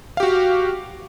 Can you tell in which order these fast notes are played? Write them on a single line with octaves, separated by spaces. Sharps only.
F5 G4 F#4